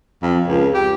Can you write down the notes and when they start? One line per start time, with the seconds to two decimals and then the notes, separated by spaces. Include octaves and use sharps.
0.23 F2
0.48 C#2
0.74 G4